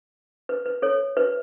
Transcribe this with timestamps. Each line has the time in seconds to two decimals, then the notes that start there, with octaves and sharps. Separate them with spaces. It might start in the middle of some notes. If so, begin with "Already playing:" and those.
0.49 B4
0.66 B4
0.82 A4 C#5
1.17 B4